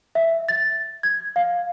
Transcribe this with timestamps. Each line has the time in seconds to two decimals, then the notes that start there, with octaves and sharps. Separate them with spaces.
0.15 E5
0.49 A6
1.03 G#6
1.36 F5